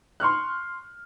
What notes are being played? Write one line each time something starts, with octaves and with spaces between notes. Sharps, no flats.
C6 C#6 F6 F#6